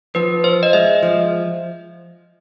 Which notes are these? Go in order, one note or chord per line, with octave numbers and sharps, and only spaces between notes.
F3 B4
F4 C5
D#5
G#3 E5
F3